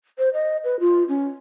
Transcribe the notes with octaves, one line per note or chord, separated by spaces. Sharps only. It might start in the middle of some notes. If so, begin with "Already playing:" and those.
C5
D#5
B4
F4
C#4